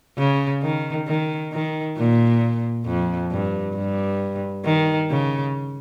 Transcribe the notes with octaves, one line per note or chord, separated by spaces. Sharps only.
C#3
D#3
D#3
D#3
A#2
F2
G2
G2
D#3
C#3